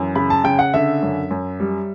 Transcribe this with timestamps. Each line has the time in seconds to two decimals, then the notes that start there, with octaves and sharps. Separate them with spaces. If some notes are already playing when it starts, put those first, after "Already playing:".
Already playing: F#2 E3
0.15 C#3 B5
0.30 A5
0.44 C#3 G5
0.59 F#5
0.74 D3 E5
1.03 F#2
1.31 F#2
1.60 G3